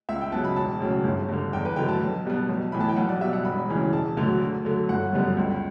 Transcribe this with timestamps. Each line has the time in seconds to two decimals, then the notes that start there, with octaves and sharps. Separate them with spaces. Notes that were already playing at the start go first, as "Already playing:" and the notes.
0.09 C#2 E5
0.21 G5
0.32 C#3 F#3 B3 A5
0.45 B5
0.56 E1 A5
0.80 D2 C#3 F#3
1.04 G1
1.29 G2 D3
1.53 E2 G5
1.65 B4
1.76 D3 F#3 A3 G5
1.88 A5
2.01 B1
2.25 B2 G3 B3
2.49 B1
2.72 A2 E3 B3 B5
2.80 A5
2.89 G5
2.96 B1 F#5
3.09 D5
3.21 B2 G3 E5
3.33 F#5
3.45 E1 B5
3.69 D2 C#3 E3
3.93 E1 A5
4.17 D2 D3 F#3 A3
4.41 D2
4.65 D3 F#3 A3
4.89 G1 F#5
5.13 F#2 D3 G3 B3
5.37 C#2